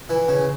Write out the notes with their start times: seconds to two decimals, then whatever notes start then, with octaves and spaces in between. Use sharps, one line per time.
0.09 E3
0.28 C#3